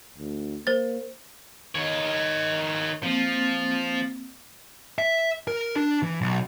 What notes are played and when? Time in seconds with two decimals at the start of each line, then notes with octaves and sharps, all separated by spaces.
0.18 D2
0.67 A#3 C5 A6
1.75 D#3 C#5
3.03 F3 A#3 C4
4.98 E5
5.48 A#4
5.76 D4
6.03 E3
6.21 B1